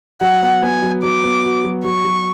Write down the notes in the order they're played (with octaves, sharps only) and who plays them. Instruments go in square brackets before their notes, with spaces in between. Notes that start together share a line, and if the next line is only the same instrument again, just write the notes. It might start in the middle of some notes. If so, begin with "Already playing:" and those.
[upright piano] F#3 [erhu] F#5
[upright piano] B3
[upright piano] B3 [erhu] G#5
[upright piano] F#3
[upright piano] F#3 [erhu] D6
[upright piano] B3
F#4
F#3
[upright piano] F#3 [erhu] C#6
[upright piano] F#3